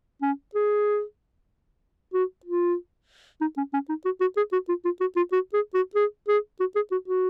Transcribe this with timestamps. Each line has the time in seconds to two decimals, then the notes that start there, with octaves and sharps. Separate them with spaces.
0.22 C#4
0.55 G#4
2.14 F#4
2.45 F4
3.41 D#4
3.57 C#4
3.73 C#4
3.89 D#4
4.05 F#4
4.21 F#4
4.37 G#4
4.52 F#4
4.69 F4
4.85 F4
5.00 F#4
5.16 F4
5.32 F#4
5.53 G#4
5.74 F#4
5.95 G#4
6.28 G#4
6.60 F#4
6.75 G#4
6.92 F#4
7.08 F#4